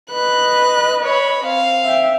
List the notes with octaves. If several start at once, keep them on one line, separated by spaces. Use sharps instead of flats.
B4 D#5 F#6
C#5 B5
C4 F5
E5 G5